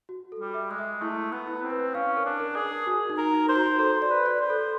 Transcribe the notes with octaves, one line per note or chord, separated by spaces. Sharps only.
F#4
A4
G3
E5
G#3
E5
A3 E4
E4
B3
E4
C4
B4
C#4 F5
A#4
D4
A#4
G#4
A#4
F#4
D#4
A#4
D#4
C5
F#4
A4 C5
D5
B4
D5
C5
A4